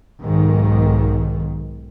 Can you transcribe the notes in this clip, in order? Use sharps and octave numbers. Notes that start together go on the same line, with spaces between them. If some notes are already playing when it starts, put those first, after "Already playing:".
B1 G#2 D#3